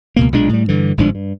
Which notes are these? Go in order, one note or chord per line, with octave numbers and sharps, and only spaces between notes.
C#2 B2 A#3
B1 A#2 G#3 D4
A2 G3
G2 D3 E3
G1 G#2 F3 D4
G2